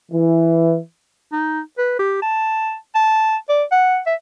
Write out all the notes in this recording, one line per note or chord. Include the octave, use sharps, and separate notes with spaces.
E3
D#4
B4
G4
A5
A5
D5
F#5
E5